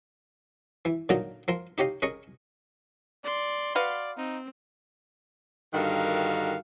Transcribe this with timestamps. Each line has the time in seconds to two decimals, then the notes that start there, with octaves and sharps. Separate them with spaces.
0.85 E3
1.09 A#2 D3 F#3 D#4 A#4 A#5
1.48 F3 A#4 C6
1.78 D#4 G4 C#5 D#5 F5
2.02 C#4 G#4 A#4 D#5 C#6
3.25 D5 C6
3.75 F#4 B4 D5 F5
4.17 C4 D#4
5.73 G2 D3 D#3 F#4 A#4 F5